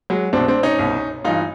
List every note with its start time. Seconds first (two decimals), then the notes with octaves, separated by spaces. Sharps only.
0.10 F#3 G#3
0.33 C2 B2 C4 D4
0.48 C4 D4
0.63 C#4 D#4
0.79 C2 B2
1.24 G2 E3 D#4 F4